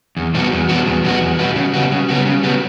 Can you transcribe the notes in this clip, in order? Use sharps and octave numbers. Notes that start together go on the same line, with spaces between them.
E2
B2 G3 B3 F#4
E2
B2 G3 B3 F#4
E2
B2 G3 B3 F#4
E2
B2 G3 B3 F#4
C#3
G3 B3 F#4
C#3
G3 B3 F#4
C#3
G3 B3 F#4